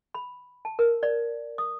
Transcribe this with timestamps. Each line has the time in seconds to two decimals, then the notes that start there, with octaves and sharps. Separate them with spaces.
0.14 B5
0.65 A5
0.79 A#4
1.03 D5
1.58 D#6